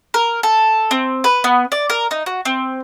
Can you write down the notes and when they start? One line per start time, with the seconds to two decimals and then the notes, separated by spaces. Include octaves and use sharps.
0.14 A#4
0.43 A4
0.91 C4
1.24 B4
1.44 B3
1.72 D5
1.90 A#4
2.11 D#4
2.26 F#4
2.45 C4